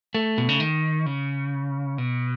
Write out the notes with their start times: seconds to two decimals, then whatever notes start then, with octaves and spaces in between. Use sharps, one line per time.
0.15 A3
0.38 B2
0.49 C#3
0.60 D#3
1.06 C#3
1.98 B2